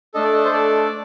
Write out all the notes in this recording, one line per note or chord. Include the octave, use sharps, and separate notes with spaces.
A3 D4 A4 D#5
D5
D#5
C5
D5